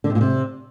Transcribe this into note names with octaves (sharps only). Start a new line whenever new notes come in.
D3
C3
A#2
C3